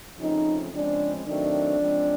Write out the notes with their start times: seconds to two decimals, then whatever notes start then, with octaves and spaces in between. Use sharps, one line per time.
0.17 C#3 F3 A3 C4 D#4
0.71 C#3 F3 G#3 C4 D4
1.23 D#3 F#3 A3 C4 D4
1.77 C#3 F3 G#3 C4